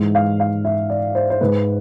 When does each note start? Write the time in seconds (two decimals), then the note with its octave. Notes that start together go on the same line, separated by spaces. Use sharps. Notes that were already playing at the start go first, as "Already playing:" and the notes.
Already playing: G#2 E3 G#3
0.15 F5
0.40 F5
0.65 E5
0.90 D5
1.15 C5
1.30 C5
1.41 G#2 G#3 B4